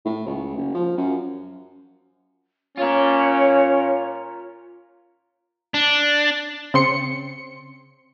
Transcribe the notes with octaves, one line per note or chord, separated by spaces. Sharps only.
A2
C#2
F#1
F3
F#2
C#4 F4 A#4 C#5
D4
C#3 C4 C6 C#7